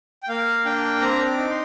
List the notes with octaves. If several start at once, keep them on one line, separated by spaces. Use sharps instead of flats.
G5
A#3 F5
D4 G5
C4 A#5
D6
D#4
C6